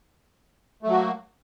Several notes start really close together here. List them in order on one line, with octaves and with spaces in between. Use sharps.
A3 F#3 F#4 A#3